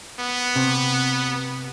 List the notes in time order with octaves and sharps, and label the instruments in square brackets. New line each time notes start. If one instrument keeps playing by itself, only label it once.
[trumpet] B3
[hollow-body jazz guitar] C3